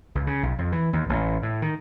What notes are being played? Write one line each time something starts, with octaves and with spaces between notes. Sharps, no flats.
C#2
C#3
B1
F2
E3
D#2
A1
A2
D#3